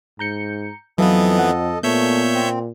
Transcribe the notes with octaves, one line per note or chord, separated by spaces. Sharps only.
G#2 A#5 G6 C#7
F2 E3 F#3 B3 A4 B4 D#5 F5
F#5
A#2 A3 B3 C#5 E5 G6
C4